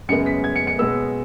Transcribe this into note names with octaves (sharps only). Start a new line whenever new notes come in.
F#2 C#3 G#3 B3 C#7
B6
G#6
C#7
C#7
B2 G#3 B3 E6